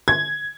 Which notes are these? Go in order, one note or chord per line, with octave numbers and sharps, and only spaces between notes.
G#6